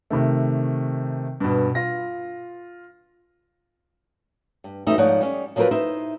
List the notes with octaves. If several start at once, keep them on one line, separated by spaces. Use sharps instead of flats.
C3 D#3 A3
G2 B2
F4 A#6
G2
F#2 E3 A3 D#4 E5
G#2 F3 D#4 C#5 D5 F#5
G3 C#4
F3 F#3 C4 F4 A#4 B4
D#4 E4 C5 E5